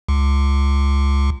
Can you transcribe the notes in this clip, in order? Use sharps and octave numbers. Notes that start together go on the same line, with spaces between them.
C#2